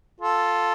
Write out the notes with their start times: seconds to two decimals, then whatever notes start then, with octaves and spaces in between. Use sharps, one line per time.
0.21 F4 A4